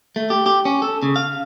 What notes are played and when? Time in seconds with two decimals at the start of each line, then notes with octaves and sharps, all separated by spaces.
0.16 A3
0.30 G4
0.46 G4
0.65 C#4
0.82 A4
1.03 C#3
1.16 F5